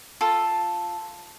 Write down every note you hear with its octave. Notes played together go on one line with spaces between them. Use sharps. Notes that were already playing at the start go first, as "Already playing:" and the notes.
F4 A4